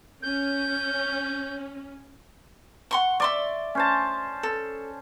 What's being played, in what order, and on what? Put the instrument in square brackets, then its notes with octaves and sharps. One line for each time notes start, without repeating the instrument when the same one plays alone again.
[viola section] C#4 [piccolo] G6
[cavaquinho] F#5 C6 C#6
[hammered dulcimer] D5 [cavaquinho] E5 C6 C#6
[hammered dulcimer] C#4 C5 A5
[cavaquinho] A4